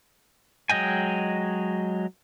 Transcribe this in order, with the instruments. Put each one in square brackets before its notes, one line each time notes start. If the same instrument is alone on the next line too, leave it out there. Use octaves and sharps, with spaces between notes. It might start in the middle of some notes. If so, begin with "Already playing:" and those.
[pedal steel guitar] F#3 G#3 D#5 G5 G#5